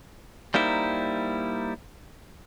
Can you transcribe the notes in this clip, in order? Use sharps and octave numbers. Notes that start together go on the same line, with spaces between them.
G3 A#3 D#4 E4 C5